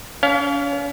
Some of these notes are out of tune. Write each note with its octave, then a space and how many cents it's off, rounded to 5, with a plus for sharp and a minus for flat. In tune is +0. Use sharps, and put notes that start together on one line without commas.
C#4 +40 F5 +0